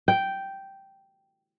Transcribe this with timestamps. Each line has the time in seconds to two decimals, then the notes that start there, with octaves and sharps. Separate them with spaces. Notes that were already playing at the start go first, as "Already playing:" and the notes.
0.08 G5